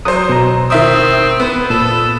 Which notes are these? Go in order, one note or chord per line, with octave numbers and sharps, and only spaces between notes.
F#3 C5 D#6
B2 A#5
D#3 C4 E5 D#6
B3
A#2 A4